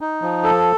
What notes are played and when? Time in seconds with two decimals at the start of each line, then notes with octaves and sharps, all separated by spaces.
0.01 D#4
0.22 F3
0.44 A4